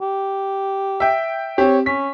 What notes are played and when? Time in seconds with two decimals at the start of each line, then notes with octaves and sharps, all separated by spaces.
0.01 G4
1.00 E5 G5
1.58 C4 G4 C#5
1.86 C#4 B6